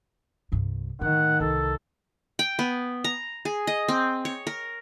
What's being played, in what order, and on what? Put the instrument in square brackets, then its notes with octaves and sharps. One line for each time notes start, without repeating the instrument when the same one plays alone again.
[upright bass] C2 G2
[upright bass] A2 [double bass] D#3 [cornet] F#5
[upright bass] C2 [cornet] A4
[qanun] G5
B3
A#5
G#4
D#5
C4
C#5
A#4